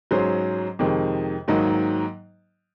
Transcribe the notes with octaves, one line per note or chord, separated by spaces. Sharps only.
G#2 F#3 C#4 G#4 C5
F2 C3 D#3 G#3
G#2 D#3 F#3 A#3 D#4